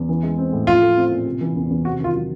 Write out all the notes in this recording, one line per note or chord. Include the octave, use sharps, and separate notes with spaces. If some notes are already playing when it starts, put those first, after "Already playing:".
Already playing: E2
E3
G#3
C4
A2
F3 F4
A3
C4
A#2
C3
E3
E2
E2
C3 F#4
D#3 F4
F#3